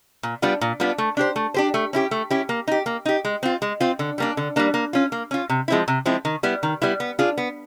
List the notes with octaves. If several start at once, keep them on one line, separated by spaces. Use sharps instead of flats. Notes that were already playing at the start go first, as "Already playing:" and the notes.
A#2
G3 B3 D4 F4
A#2
G3 B3 D4 F4
A3
D4 G4 C5
A3
D4 G4 C5
A3
C#4 E4 G4
A3
C#4 E4 G4
A#3
D#4 G4
A#3
D#4 G4
G#3
C4 F4
G#3
C4 F4
D3
G3 A#3 D4
D3
G3 A#3 D4
A#3
C#4 F4
A#3
C#4 F4
C3
F3 G#3 C4 E4
C3
F3 G#3 C4 E4
D#3
G3 B3 E4
D#3
G3 B3 E4
B3
D4 F4 G#4
B3